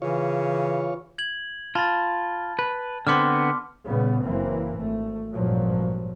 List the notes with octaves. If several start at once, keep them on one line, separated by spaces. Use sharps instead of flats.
C#3 E3 F4 C#5
G#6 F#7
F4 A5 B5 A6
B4
D3 B3 C4 C6 D6 F6
A#2 C#3 G3 B3
F#1 E3 A#3 C4
G#1 A3
G#1 G2 A#2 F3 F#3